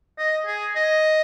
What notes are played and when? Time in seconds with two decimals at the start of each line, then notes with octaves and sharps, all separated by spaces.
0.18 D#5
0.46 G#4
0.76 D#5